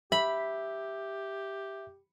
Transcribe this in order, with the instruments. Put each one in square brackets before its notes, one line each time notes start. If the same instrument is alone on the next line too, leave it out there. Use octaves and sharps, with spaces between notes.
[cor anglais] G4 [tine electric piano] E5 [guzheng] B5